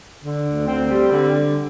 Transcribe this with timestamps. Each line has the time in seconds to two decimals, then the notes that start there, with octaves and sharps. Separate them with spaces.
0.22 D3
0.45 D2
0.68 C4
0.89 G3
1.11 D3